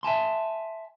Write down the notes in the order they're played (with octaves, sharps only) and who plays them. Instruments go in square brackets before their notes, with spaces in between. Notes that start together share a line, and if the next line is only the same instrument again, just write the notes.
[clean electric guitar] E5 G#5 A5 C6